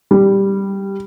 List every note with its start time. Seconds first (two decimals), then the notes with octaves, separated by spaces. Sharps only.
0.11 G3